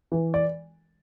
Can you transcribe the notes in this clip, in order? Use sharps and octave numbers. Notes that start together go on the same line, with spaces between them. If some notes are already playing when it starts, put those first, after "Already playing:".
E3
D5